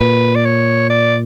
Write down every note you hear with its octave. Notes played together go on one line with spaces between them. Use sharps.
A#2 B4
D5
C#5
D5